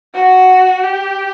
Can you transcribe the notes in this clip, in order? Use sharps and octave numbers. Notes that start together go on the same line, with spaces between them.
F#4
G4